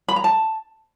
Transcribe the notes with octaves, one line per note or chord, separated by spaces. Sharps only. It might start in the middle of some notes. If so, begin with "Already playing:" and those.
B5
A#5
A5